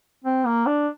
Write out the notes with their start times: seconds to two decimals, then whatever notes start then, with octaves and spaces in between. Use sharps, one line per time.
0.24 C4
0.46 A#3
0.66 D4